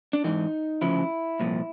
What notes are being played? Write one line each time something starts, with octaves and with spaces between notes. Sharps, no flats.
D4
G#2 E3 D#4
D2 C#3 F3 E4
C2 A#2 F3